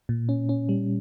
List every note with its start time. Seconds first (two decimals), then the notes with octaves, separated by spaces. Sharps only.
0.09 A#2
0.29 C#4
0.49 C#4
0.69 G3